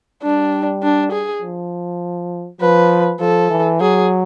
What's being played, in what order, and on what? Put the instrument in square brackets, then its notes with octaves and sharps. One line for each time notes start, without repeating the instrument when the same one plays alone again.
[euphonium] G3 [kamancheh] D4
[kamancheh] D4
G#4
[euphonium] F3
[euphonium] F3 [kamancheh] B4
[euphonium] F3 [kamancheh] A4
[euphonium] E3
[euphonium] F#3 [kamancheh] G#4